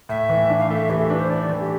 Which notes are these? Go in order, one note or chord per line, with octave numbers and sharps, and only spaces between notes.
A2 E5
E3
D4
F5
A3 E5
E3 G4
A4
D4 B4
C5
D4 D5
E3
G4